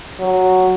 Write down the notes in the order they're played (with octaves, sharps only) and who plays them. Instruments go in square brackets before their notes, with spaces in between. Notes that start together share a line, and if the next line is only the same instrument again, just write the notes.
[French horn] F#3